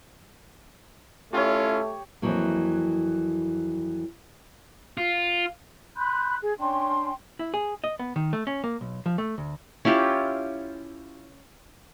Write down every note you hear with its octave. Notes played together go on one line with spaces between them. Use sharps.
A3 C#4 E4 F4 G4 C#5
F2 E3 F#3 A#3
F4
B5 C6 F#6 G6
G#4
C#4 D4 G5 C6
E4
G#4
D#5
B3
D#3
A3
C#4
A#3
B1
F3
A3
D2
C#4 E4 F4 G4